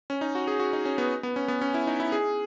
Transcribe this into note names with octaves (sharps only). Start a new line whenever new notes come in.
C#4
D#4
F#4
G#4
F#4
D#4
C#4
B3
B3
C#4
B3
C#4
E4
D#4
E4
G#4